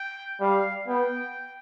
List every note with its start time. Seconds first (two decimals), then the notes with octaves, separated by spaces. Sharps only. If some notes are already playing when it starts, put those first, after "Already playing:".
Already playing: G5
0.40 G3 F5
0.88 B3 G5